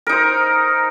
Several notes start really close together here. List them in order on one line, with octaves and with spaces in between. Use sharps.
A#4 D#4 C5